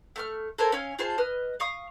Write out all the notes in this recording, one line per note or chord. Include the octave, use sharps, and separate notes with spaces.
A3 C#6 F6
A4 A#4 C5 G#5
C#4 F5 G#5
F4 G#4 C5 A5
B4 D#5 F6
F5 C#6 D#6